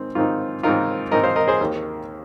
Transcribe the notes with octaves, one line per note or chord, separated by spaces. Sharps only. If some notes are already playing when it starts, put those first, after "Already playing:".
Already playing: G#2 D#3 C4 D#4
G#2 D#3 C4 D#4 F4
G#2 D#3 C4 D#4 F4 A#4
G#2 D#3 C4 D#4 A#4 D#5
C5 F5
A#4 D#5
G#4 C5
D#2 D#3 A#3